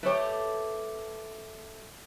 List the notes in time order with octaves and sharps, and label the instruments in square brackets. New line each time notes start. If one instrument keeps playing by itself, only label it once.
[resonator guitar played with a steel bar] A3 G4 [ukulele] B4 C#5